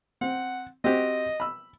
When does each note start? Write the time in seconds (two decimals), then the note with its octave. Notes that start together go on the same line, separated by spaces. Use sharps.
0.21 C4 F#5
0.84 C4 F#4 G4 D#5
1.40 B5 E6